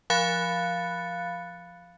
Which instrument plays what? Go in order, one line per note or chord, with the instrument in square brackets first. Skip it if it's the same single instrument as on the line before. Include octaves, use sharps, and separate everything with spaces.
[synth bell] F3 F5 B5 F#6 A6 C#7